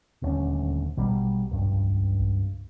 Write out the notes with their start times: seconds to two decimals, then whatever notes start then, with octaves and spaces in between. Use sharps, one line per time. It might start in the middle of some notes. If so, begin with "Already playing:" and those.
0.22 D#1 D2 C#4
0.97 A#1 B2 F#3 G3
1.51 C#2 G2